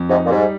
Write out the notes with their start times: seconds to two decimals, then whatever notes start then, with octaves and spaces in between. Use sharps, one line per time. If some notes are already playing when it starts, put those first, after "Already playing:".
Already playing: F2
0.09 G#2 C3 D#4
0.25 A#2
0.30 G#2 G3